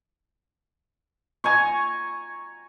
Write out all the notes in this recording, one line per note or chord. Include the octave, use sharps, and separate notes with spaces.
G#5 A#5 C#6